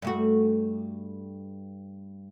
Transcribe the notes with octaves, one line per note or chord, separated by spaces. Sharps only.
G2 A3 F#4